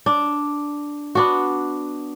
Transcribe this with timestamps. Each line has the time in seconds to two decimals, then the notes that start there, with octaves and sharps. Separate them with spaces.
0.06 D4
1.15 B3 D4 F#4